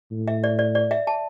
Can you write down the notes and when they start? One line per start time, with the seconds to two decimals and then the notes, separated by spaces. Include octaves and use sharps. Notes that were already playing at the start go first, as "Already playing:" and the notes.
0.12 A2
0.28 E5
0.44 D5
0.59 D5
0.75 D5
0.91 E5
1.07 A5